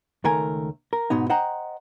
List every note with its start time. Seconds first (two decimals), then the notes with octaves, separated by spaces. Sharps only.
0.24 C#2 D#3 A3 A#4 G#5
0.93 A#4
1.10 G#2 B2 B3 D#4
1.30 C5 D#5 F#5 G5 A#5